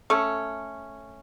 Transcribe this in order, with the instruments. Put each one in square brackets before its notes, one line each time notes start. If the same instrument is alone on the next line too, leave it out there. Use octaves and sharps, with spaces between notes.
[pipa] A3 C#4